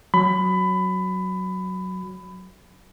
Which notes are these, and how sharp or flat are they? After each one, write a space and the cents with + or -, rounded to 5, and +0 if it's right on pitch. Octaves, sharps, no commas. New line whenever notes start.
F#3 +0 B5 +20